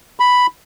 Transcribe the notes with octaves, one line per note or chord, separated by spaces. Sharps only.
B5